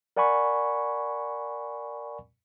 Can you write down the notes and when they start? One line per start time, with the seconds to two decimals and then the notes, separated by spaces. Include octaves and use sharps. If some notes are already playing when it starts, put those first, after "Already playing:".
0.17 A#4 D5 F#5 G#5 B5 C#6